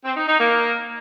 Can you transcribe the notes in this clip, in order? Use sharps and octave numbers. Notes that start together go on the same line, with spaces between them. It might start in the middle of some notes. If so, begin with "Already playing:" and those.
C4
D#4
D#4
A#3